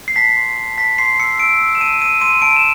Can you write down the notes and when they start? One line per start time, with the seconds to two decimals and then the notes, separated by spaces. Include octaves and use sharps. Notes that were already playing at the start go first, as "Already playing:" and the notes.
0.08 C7
0.16 A5 B6
0.37 C6
0.58 A5
0.77 A5 B6
0.98 C6 C7
1.19 E6 C#7
1.39 E6 D7
1.60 E6
1.75 E7
1.80 A5 D#7
2.01 E6 D#7
2.21 C6 D#7
2.42 A5 D7
2.56 E7